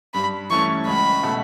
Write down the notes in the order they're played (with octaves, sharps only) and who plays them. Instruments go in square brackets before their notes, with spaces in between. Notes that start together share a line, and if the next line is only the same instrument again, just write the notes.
[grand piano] G2 [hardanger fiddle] B5
[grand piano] E3 A3 C#4 [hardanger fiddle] C#6
[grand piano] C#2 [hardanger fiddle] B5
[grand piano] B2 A3